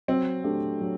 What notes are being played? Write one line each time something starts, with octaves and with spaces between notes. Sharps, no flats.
F#3 C4
A3 D4 G4
F#3